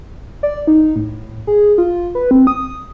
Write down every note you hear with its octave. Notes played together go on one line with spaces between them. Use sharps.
D5
D#4
A2
G#4
F4
B4
C4
D#6